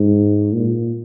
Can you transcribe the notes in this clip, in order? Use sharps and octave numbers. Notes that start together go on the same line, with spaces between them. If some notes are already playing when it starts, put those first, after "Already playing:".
Already playing: G#2
A#2